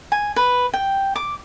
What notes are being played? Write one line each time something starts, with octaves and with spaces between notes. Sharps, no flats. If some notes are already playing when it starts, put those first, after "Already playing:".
G#5
B4
G5
D6